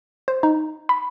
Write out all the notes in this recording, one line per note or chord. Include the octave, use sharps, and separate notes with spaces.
C5
D#4
B5